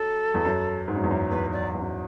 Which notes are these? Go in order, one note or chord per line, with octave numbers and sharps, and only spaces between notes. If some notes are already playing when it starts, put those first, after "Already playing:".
Already playing: F#2 A4
E2
F#2
G#2
F#2
E2
F#2
E2 B4
F#2 D5
E2
F#2